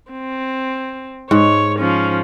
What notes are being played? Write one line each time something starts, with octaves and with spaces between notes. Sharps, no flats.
C4
G#2 C#5
F3 C#4